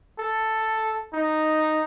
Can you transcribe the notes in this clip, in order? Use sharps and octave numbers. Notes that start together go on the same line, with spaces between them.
A4
D#4